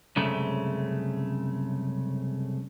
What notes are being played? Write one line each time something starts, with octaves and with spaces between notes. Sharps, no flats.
C2 F#2 C#3 G#3 A3